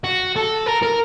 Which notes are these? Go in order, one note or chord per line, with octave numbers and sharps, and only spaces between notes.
F#4
A4
A#4
A#4